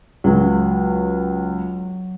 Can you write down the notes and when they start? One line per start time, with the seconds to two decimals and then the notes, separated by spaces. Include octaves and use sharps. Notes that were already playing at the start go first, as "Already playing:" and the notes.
0.24 C#2 F#3